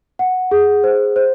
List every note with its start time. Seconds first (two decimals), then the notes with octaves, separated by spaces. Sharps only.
0.19 F#5
0.51 G#4
0.84 C5
1.16 C5